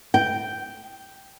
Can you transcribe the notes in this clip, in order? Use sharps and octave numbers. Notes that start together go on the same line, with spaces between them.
G5